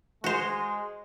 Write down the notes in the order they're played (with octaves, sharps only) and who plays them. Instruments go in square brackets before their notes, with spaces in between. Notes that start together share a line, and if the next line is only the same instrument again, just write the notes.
[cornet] G#3 [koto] F#4 C5